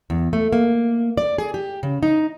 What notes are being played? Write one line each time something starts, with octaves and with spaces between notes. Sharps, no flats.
E2
A3
A#3
D5
G#4
G4
C#3
D#4